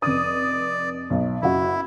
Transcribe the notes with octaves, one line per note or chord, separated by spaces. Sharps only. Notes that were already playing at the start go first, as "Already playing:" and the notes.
F1 D5 D#6
B1
F#1 E4 F#4